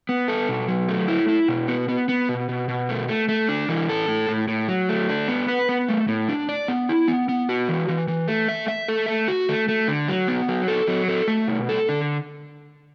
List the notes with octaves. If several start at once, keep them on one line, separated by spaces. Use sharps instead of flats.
B3
A4
B2
F#3
A3
E4
E4
B2
B3
B3
B3
B2
B2
B2
A3
A3
A3
D4
E3
A4
A2
A2
A2
F#3
A3
D4
B3
B4
B3
A3
A2
D4
D5
B3
E4
B3
B3
F#4
E3
E3
E3
A3
E5
E5
A4
A3
F#4
A3
A3
D3
F#3
B3
F#3
A4
F#3
A4
A3
B2
A4
D3